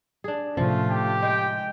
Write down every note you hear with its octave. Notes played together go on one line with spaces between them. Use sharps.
D4 G#4
A2 C3 F3 A3 C#4 F4
G4
G#3 G5